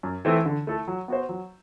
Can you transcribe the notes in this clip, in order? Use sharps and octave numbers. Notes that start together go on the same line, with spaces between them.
F#2
E3 A3 C4 E4
D3
A3 E4 A4
F#3
B3 F#4 C5
F#3